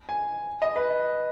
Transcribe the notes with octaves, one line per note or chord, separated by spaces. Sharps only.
G#5
D#5
B4